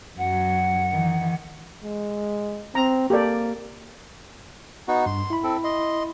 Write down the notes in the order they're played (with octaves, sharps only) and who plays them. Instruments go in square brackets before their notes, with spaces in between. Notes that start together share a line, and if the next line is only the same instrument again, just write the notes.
[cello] F#2 F#3 [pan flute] F#5
[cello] D#3 E3
[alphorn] G#3
[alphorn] C4 [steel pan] A#5
[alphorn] A#3 [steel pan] G4 A4 D5
[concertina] B3 D#4 F#4
[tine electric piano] G2 [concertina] C6
[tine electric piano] E4 B5
[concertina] C4 A4
D#5 C6